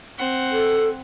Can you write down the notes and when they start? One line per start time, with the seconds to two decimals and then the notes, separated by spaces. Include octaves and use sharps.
0.18 C4 F#5
0.51 A4